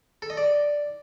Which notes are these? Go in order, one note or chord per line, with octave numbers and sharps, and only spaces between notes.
A4
D#5
D5